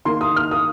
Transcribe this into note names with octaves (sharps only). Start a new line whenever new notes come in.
D#3 A#3 C6
D#6
F6
D#6